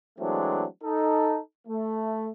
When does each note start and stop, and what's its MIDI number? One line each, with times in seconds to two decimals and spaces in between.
0.19 0.63 52
0.19 0.63 54
0.19 0.63 56
0.19 0.63 57
0.19 0.63 60
0.19 0.63 62
0.83 1.37 63
0.83 1.37 69
1.68 2.28 57